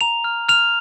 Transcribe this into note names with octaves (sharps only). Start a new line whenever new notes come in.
A#5 F7
F6
F6 F7